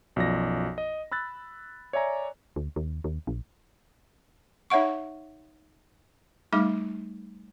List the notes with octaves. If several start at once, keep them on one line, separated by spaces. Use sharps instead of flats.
B1 F#2 F3 D5 A#6
D#5
B5 E6 F#6 A6
C#5 D5 E5 G#5 A#5
D2
D#2
D#2
A#1
D#4 C#5 E5 F#5 C#6
G3 A3 D#4 D6